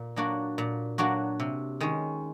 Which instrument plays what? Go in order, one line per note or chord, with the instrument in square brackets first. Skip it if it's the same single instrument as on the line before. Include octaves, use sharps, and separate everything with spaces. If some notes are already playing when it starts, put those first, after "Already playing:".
Already playing: [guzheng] A#2
F#3 A#3 D4 F#4
A#2
F#3 A#3 D4 F#4
C3
D#3 G#3 C#4